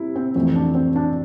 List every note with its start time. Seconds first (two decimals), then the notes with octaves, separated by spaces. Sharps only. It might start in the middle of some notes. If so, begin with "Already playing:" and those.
Already playing: C3 E4
0.15 C4
0.36 F2 E3 A3 C4
0.55 D4
0.75 C4
0.96 D4